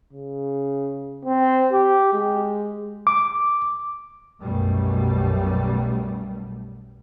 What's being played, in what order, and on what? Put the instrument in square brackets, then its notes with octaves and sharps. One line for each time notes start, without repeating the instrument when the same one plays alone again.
[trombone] C#3
C4
G4
G#3
[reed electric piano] D6
[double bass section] B1 F#2 B2 F#3 G3 A3